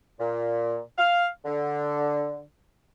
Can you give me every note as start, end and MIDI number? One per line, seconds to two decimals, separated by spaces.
0.20 0.79 46
0.98 1.27 77
1.45 2.41 50